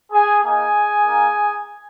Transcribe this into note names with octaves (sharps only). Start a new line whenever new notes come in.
G#4 G#5
A#3 D#4 G#4 G#5
A#3 D#4